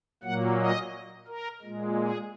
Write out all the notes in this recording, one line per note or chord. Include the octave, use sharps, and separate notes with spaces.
A#2 F#3 A#3 F#5
D#5
A#4
A#2 G#3
G#4